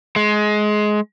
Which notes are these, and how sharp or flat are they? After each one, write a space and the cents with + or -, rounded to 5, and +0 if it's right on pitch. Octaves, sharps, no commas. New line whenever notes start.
G#3 +20